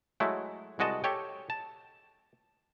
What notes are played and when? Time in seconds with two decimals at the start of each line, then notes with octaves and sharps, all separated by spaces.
0.20 F#3 G#3 A3 E4
0.79 C2 G#3 F#4 D#5 A5
1.04 G4 A4 C#5 G5
1.50 A5